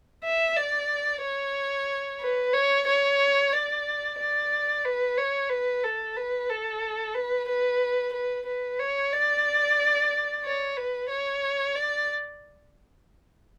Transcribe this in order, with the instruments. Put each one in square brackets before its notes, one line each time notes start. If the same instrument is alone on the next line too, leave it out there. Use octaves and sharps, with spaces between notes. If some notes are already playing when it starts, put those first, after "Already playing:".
[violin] E5
D5
C#5
B4
C#5
C#5
D5
D5
B4
C#5
B4
A4
B4
A4
B4
B4
B4
B4
C#5
D5
C#5
B4
C#5
D5